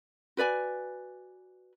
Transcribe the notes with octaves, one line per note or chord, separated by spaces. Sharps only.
F#4 B4 D5 G#5